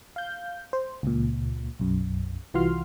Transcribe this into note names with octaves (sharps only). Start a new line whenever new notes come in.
F5 G6
C5
C#2 A#2
B1 F#2
C2 E3 F4 F#4 C6 F6